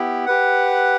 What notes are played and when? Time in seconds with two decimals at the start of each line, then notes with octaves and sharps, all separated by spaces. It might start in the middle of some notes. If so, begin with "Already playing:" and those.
Already playing: B3 E4 G4
0.26 G4 B4 F#5